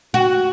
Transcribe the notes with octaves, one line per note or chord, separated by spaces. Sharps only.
F#4